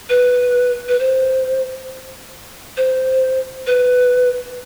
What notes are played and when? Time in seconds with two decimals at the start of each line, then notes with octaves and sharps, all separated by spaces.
0.09 B4
0.88 B4
0.99 C5
2.77 C5
3.67 B4